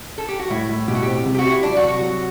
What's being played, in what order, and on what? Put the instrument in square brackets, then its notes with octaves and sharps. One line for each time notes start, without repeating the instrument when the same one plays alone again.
[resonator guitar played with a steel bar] A4
G4
F#4
[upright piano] A2 [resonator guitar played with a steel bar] E4
[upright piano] A2
[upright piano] B2 [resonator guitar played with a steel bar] G4
[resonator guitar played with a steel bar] F#4
[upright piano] C4 [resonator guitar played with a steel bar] G4
[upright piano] C3
[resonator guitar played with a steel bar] G4
F#4
[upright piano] G4
[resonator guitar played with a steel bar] E4
[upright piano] F#3 [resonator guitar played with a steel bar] D4
[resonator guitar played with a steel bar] F#4
[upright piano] C3
[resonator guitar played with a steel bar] F#4
[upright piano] F#3